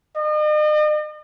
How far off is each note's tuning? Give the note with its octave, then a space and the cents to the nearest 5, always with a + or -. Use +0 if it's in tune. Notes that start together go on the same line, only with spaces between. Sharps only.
D#5 -45